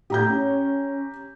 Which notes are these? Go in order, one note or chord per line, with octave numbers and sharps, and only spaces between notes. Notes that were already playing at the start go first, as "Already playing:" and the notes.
A2 G4 A#5 G6
C#4